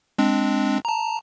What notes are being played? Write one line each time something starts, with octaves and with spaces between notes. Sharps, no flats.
G#3 C4 D4
A5 A#5